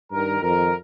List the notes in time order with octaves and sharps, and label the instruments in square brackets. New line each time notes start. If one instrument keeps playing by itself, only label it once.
[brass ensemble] G2 D#3 A#4
F2 D#3 A#4